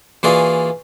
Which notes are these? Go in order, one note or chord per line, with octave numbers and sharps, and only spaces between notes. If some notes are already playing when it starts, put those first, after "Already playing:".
E3 A#3 F4 F#4 G#4 D5